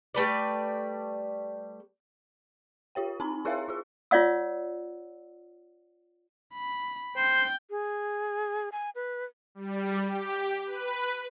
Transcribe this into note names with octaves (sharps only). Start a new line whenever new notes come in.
G3 A3 B4 D5
F4 G4 C#5 G5
C4 D#4 A#5
E4 G#4 A#4 C#5 E5 F5
F4 G#4
F4 C#5 D5 F#5 E6
B5
C5 G5 G6
G#4
G#5
B4
G3
G4
B4